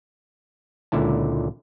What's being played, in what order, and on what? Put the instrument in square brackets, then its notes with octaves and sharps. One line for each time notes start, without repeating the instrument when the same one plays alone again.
[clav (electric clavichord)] C#2 A#2 D3 E4 A5